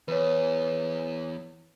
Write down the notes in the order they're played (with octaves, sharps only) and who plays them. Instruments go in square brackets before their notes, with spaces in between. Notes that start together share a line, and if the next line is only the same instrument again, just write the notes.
[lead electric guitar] E2 [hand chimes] B4 C#5